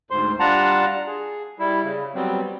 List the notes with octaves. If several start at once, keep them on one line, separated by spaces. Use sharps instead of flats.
D2 G#2 C5 C6
G3 D4 F4 F#5 A5 A#5
G#4
G3 E4
C#3
F#3 G3 B3 C4